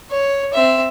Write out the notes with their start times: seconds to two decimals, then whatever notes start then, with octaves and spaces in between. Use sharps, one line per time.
0.11 C#5
0.53 C4 E5